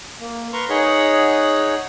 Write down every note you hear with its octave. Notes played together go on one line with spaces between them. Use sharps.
A#3
A#4 B4 A#5 C6 C#6
D#4 G#4 C#5 F#5